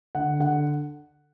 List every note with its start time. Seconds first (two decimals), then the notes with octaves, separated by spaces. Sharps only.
0.15 D3 F#5
0.40 D3 F#5